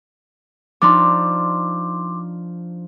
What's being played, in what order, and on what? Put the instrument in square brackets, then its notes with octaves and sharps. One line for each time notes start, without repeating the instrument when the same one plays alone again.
[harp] F3 D4 D#4 [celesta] C6 D6